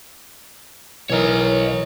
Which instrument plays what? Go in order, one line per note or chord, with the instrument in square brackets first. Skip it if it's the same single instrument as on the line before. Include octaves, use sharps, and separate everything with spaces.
[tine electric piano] B1 E3 A#4 [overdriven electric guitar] C#5 D#5